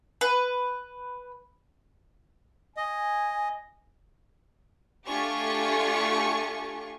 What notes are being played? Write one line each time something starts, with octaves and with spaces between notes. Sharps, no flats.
B4
D#5 G#5
A3 D4 F4 G4 G#5 C#6